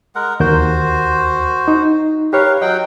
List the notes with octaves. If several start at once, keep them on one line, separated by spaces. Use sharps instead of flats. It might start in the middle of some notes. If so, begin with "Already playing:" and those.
G#3 A#4 F#5
D#2 F#4 A#4 C5 G6
D#4
G4 A#4 B4 C#5 F5
F#3 D#5 F#5 G5